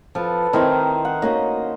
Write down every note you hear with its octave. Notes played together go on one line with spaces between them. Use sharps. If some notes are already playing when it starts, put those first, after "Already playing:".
F3 A4 B4
D#3 C4 D#4 E4 A#4 C5
F#5
A#3 C#4 F#4 D#5